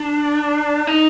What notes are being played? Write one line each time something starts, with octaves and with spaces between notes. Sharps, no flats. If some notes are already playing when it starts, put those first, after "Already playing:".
Already playing: D4
D#4